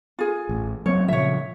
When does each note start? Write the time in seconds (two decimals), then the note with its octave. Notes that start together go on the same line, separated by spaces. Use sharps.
0.19 F4 G#4
0.49 A1
0.86 F#3 A#3 C4 C#5
1.08 A#2 C#3 F3 C#5 E5